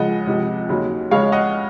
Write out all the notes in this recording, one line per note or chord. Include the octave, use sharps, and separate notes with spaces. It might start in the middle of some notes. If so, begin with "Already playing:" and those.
Already playing: C#2 C#3 F3 G#3 D#5 F#5
C#2 C3 F3
D#2 C#3 F#3
C#2 C#3 G#3 C#5 F5
D#5 F#5